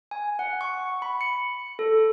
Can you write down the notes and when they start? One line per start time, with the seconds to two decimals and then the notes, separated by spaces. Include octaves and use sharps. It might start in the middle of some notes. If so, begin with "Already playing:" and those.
0.11 G#5
0.39 F#5
0.61 C#6
1.02 B5
1.21 C#7
1.79 A4